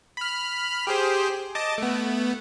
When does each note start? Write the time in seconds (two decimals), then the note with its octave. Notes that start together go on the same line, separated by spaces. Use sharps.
0.17 B5 F6
0.87 G4 G#4 C5
1.55 D#5 A5 D6
1.78 A3 B3